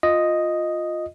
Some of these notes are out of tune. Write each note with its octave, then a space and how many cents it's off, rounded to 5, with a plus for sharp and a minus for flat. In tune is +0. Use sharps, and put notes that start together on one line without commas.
F4 +10 D#5 +0